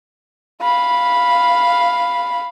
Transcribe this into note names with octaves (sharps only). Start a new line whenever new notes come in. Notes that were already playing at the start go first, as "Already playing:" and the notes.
F5 B5